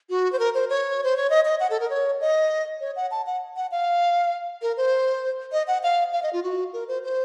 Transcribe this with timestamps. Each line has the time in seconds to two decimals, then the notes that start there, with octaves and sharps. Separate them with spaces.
0.10 F#4
0.32 C5
0.39 A#4
0.54 C5
0.70 C#5
1.04 C5
1.17 C#5
1.30 D#5
1.45 D#5
1.60 F#5
1.70 A4
1.80 A#4
1.90 C#5
2.21 D#5
2.81 C#5
2.96 F#5
3.11 A5
3.26 F#5
3.56 F#5
3.72 F5
4.62 A#4
4.77 C5
5.52 D#5
5.67 F#5
5.83 F5
6.13 F5
6.23 D#5
6.33 F4
6.43 F#4
6.73 A#4
6.88 C5
7.04 C5